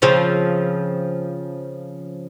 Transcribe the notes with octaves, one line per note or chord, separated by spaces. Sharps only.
C#3 F3 C4